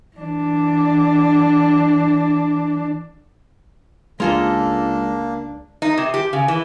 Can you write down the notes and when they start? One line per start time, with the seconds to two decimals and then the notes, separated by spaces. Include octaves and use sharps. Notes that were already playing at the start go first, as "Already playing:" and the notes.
0.17 E3 D4
4.20 C#2 G#3 A#3 D4 F4 A4 A#4 D#5
5.82 D#4
5.98 C3
6.14 G4
6.33 C#3
6.48 E3